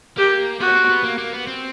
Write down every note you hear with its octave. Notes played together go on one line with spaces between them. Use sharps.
A#3 G4
B3 F#4
C#4
C4
B3
A#3
A#3
B3
C4